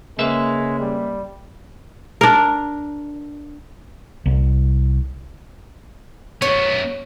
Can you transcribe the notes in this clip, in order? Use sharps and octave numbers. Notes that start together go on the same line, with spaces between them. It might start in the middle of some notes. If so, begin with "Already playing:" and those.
C#3 G#3 A#3 B4 E5
G3
D4 A#4
C2
F#2 B3 C#5